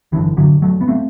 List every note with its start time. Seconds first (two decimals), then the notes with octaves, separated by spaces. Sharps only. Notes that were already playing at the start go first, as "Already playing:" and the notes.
0.12 G1 F#2 D3 E3
0.37 D3 F#3
0.62 F#3 A3
0.81 B3
0.88 A3 C4